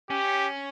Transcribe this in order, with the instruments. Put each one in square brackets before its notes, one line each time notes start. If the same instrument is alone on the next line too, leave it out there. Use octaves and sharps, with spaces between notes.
[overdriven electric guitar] C#4 [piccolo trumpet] G4